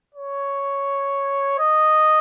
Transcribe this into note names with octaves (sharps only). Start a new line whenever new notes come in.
C#5
D#5